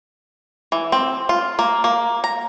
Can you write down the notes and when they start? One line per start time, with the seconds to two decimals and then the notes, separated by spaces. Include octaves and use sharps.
0.72 E3
0.92 C4
1.29 F4
1.59 A#3
1.84 A#3
2.24 A#5